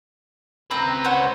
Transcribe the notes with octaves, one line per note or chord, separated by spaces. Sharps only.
C#2 C4 B4 A#5
C5 C#5 F#5